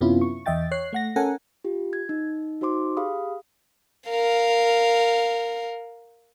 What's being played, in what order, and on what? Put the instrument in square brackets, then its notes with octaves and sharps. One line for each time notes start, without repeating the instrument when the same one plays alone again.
[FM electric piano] F#2 C3 B3 C#4 E4 F4
C#6
E2 D#5 E5 G5 A6
C#5 F#6 C7
A3 F#5 A#6
C#4 A4 A#4 F#5 G#5
[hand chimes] F4 G4
G#6
D#4
D#4 F#4 C5 C6 D6
G4 G#4 F5 B5 D#6
[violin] A#4 F5